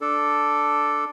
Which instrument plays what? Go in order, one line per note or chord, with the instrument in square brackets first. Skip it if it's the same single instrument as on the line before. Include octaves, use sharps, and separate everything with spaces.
[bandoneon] D4 A4